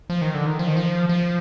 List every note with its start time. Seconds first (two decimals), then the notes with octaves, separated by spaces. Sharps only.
0.10 F3
0.22 D#3
0.34 D3
0.46 D#3
0.59 F3
0.68 D#3
0.77 F3
1.09 F3